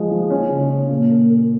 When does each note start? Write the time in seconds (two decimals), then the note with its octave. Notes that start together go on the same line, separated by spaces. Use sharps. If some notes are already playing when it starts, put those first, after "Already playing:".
Already playing: F3 G#3
0.11 F3
0.30 C#4
0.50 C#3
0.69 C#4
0.90 A#2
1.09 A#3
1.29 A#3